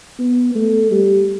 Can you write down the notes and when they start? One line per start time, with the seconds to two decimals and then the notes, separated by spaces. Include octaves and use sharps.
0.19 B3
0.55 A3
0.91 G3